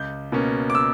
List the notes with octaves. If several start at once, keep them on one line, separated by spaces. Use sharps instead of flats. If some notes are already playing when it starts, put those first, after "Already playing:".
Already playing: C#2 G6
B2 A#3 C#4
D6
E6